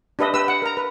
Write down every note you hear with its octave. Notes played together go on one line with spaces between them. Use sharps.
D4 G4 B4 D#5 E5
G4 B4 E6
F#5
A#4 A#5
B4